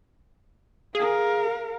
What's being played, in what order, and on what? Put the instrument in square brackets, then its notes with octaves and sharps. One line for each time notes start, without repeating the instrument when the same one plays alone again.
[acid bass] G#4 [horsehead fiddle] A#4 F5